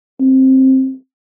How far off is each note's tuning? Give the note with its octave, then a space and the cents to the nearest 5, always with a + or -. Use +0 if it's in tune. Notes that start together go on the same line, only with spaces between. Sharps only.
C4 +10